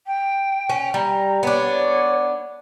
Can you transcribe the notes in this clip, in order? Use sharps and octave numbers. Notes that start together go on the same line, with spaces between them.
G5
C#4
G3 A#5
B3 D4 C#5